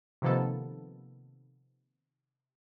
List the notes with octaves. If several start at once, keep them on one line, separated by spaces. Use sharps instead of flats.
C3 D#3 F3 A#3 B3 A4